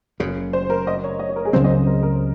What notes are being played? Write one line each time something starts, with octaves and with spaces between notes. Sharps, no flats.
F#1 F#2 C#3
C5
A#4
D#5
C#5
D#5
C#5
A#4
G#4
C#2 C#3 F#3 C4 C5
D#5
A#4
A#4